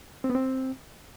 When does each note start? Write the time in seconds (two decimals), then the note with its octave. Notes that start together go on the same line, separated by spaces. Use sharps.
0.24 C4
0.30 B3
0.35 C4